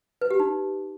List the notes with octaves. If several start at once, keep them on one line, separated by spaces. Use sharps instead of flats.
B4
G4
D#4